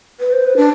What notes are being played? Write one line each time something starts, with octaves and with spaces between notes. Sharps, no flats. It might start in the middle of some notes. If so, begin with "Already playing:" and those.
B4
C5
B4
D4